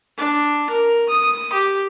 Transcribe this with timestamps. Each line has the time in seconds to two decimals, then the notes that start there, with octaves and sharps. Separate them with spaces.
0.18 D4
0.70 A#4
1.09 D#6
1.53 G4